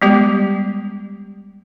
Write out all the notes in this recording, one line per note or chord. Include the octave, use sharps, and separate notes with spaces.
G3 G#3 B3 G4